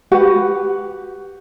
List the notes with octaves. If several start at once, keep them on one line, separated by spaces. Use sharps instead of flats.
F#4 G4 B4 F#5